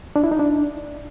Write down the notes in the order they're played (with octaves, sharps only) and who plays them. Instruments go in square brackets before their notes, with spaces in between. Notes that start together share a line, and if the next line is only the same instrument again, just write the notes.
[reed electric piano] D4
E4
D#4
D4